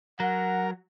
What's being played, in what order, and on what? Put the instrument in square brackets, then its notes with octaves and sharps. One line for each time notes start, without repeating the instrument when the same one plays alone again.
[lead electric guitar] F#3 [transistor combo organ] A#4 [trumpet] F#5